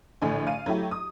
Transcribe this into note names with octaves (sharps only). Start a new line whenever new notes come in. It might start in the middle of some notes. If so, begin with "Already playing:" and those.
A#1 A2 D3 G#5
F5 D#7
F#3 A3 E4 G4
D#6